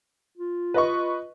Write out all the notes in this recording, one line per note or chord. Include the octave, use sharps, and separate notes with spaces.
F4
B4 D#5 C#6